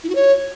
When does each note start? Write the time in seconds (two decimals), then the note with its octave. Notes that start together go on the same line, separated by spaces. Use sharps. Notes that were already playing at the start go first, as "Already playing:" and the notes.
0.04 E4
0.09 F#4
0.15 C#5